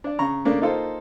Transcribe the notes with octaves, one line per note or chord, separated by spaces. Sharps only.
D4 D5
C#3 A#5 C#6
C#3 A3 A#3 D4
A#3 D#4 F4 A4 C5